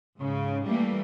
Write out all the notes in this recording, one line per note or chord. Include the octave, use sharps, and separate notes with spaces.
G#2 C#3
E3 G3 A3 A#3